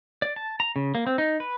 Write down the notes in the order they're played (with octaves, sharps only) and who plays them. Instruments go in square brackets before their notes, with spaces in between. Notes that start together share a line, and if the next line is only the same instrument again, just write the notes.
[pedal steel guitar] D5
A5
A#5
C#3
A#3
C4
D#4
B4